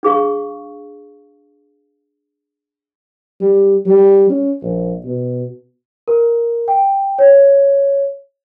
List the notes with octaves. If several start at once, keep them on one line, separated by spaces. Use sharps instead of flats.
D4 G#4 F5 C#6
G3
G3
C#4
A#1
B2
A#4
G5
C#5